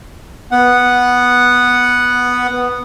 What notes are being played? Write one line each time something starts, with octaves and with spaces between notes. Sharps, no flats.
B3 F#5